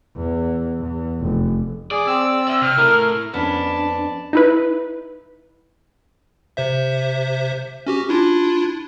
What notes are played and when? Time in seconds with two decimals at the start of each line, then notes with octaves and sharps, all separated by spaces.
0.15 E2
0.80 E2
1.20 F1
1.91 G#4 D5
2.07 C4 E6
2.48 D5 E5
2.62 C3 F6
2.78 A3 E4 A#4
3.34 F2 B3 C#4 D4 D5 A5
4.33 D#4 E4 B4
6.57 C3 C5 E5
7.87 C#4 F#4 G4
8.09 D4 E4 F4